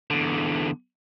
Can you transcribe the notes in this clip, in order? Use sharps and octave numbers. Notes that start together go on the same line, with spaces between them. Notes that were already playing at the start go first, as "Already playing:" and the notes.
E2 D3